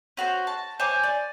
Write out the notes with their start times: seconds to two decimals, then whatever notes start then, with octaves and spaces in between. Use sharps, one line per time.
0.17 C#4 F#4 A#4 C5
0.47 A5
0.80 C5 C#5 G#5 D6
1.03 D5